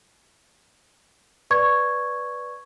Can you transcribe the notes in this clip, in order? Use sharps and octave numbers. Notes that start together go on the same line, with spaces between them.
B4 D5 C#6 G#6